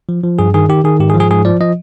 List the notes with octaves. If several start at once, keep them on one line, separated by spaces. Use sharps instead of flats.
F3
F3
G2 G#4
D#3 G#4
D#3 G4
D#3 G#4
G#2 G4
G#4
F3
G#4
G#2 G#4
F3 D5
F3 D#5